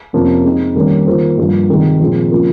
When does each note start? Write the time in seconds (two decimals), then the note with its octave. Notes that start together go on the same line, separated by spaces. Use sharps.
0.13 F2 C3 F3 A#3 C#4
0.44 G#3 C4 D#4
0.75 D#3 G3 A#3 C#4
1.07 D#3 A#3 F4 C5
1.38 G2 F3 A#3 F4
1.69 C3 D#3 G#3 D#4
2.00 A#2 F3 G#3 C4
2.31 C#3 F3 A#3 F4